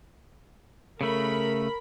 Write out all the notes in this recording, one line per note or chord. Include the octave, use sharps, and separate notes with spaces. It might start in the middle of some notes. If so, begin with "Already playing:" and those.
C#3 A3 A#4 B5